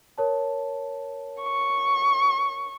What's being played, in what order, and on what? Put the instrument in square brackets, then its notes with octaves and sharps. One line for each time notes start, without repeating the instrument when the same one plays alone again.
[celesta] A#4 C#5 A5
[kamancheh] C#6